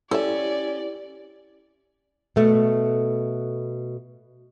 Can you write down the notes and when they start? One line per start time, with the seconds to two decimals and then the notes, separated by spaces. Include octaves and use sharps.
0.11 C#4 E4 G4 A4 C#5 D5 E5
2.36 B2 A3